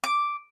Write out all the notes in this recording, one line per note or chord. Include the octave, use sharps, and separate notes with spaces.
D6